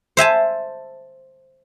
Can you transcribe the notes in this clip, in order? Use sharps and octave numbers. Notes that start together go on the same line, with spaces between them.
C5 E5 G#5 A5